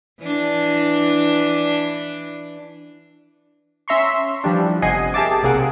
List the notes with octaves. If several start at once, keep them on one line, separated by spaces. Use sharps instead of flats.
E3 D4
C#4 E5 A#5 C6 C#6
E3 F3 G3 D4
G1 C3 D#5 F#5 G#5 C7
G4 G#4 A#4 E5 A5 D6
B1 C3 A#3 G#4 F#5 D7